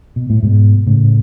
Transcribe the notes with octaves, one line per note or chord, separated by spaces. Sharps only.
B2
A2
G#2 B2
A2 C#3